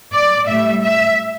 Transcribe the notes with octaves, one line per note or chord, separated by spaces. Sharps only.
D5
A2 G3 E5
E5